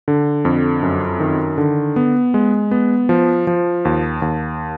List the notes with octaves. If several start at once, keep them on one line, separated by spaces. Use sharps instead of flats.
D3
F2
F#2
D#3
D3
B3
G#3
B3
F3
F3
D#2
D#2